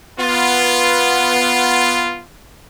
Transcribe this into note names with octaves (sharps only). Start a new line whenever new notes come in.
B3 F4